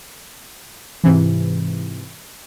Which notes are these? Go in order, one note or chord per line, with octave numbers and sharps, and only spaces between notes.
G#2 C3 E3